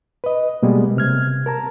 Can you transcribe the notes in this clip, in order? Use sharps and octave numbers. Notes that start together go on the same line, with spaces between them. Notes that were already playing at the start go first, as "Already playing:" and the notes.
B4 D#5
B2 G3 G#3 A#3 B3
C3 F6 G#6
A#4 A5 A#5